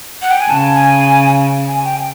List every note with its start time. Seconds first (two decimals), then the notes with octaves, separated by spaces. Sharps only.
0.22 F#5
0.31 G5
0.41 G#5
0.49 C#3 A5
0.75 G#5
1.68 G#5
1.85 G5